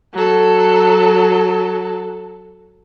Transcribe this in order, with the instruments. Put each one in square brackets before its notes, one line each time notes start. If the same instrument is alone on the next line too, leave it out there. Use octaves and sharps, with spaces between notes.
[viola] F#3 A4